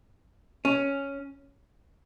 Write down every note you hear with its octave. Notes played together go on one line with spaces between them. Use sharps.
C#4